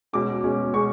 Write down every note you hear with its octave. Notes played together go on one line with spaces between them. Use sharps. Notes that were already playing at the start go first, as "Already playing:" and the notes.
B2 G#3 C#4 D6
B2 G#3 C#4
B2 G#3 C#4 C#6